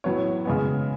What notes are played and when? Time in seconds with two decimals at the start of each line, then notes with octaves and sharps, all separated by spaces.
0.04 A2 F#3 B3 C#5
0.45 C#3 G#3 B3